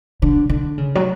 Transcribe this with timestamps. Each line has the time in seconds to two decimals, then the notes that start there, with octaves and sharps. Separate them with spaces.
0.22 D3
0.49 D3
0.78 C#3
0.95 F#3